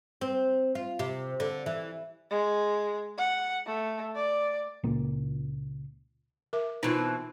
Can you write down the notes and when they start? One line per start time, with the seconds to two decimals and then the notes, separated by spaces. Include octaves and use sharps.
0.21 C4
0.75 F4
0.99 C3
1.40 D3
1.66 E3
2.31 G#3
3.18 F#5
3.66 A3
4.16 D5
4.84 C#2 A#2 A#3
6.53 A#4 E5 D6
6.83 B2 E3 C4 D#4 F4